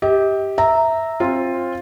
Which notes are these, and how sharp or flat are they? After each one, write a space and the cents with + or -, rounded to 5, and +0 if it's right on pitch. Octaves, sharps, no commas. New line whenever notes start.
G4 +0 D#5 +45
E5 -10 A#5 -10
C4 +25 F4 +0